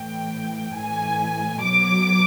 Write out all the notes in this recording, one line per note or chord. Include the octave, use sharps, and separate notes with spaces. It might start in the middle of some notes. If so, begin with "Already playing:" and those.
Already playing: A2 E3 G5
A2 E3 G#5
B2 F#3 D6